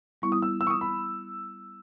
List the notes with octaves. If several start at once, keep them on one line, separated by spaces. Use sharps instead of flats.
G3 B3 E4 C#6
D#6
E6
E6
C#6
D#6
B5